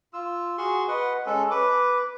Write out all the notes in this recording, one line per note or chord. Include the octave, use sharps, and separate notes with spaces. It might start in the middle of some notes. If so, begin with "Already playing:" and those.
F4 E6
F#4 G#4 C6 C#6
B4 D#5 F#5
G#3 C#4 A4
B4 D6